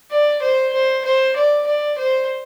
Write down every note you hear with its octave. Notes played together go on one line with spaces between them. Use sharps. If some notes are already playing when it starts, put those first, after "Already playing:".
D5
C5
C5
C5
D5
D5
C5